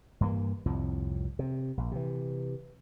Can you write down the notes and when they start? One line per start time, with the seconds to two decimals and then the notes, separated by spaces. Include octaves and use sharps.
0.21 G2 E3 A#3
0.66 C2 F2 A2
1.39 C3
1.77 A#1
1.92 C3 E3